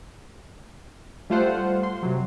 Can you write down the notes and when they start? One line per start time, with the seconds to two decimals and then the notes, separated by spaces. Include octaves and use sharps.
1.30 G3 A3 F4 A4 C5 F#5
1.83 C6
2.03 C3 F#3